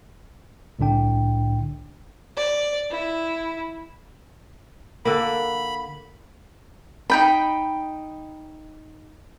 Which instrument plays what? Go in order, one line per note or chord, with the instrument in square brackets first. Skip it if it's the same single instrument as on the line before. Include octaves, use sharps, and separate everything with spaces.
[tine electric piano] C2 A2 D3 D4 G5
[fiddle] D5
E4
[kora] D3 A#3 [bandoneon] B5
[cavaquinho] D#4 G5 B5